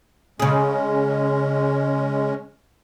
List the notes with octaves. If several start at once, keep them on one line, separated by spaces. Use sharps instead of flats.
C#3 G#3 C#4 G#4